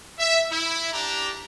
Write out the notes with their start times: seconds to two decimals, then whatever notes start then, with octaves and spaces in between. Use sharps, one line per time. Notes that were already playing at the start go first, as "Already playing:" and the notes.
0.19 E5
0.51 E4
0.92 D4 G4 A#5